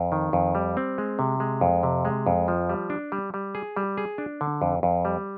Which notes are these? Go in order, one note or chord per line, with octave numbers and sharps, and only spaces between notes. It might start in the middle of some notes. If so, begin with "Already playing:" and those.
Already playing: F2
D#3
F2
G3
C4
G#3
C3
G#3
F2
C3
G#3
F2
F3
G3
D4
G3
G3
G#4
G3
G#4
D4
D3
F2
F2
G3